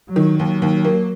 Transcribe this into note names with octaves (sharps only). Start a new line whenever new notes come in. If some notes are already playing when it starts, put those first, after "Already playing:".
F#3
D#3
D#2 F#3
D#2
A#3